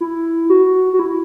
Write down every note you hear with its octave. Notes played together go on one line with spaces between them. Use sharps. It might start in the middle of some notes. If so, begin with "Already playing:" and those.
E4
F#4
F#4
E4